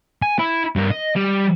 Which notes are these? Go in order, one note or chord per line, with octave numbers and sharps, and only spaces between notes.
G#5
E4
G2 A#4
D#5
G3